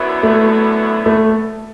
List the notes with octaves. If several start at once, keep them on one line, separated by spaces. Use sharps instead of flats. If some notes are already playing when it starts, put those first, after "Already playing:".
Already playing: F#2 D3 F#3 B3 E4
A3
A3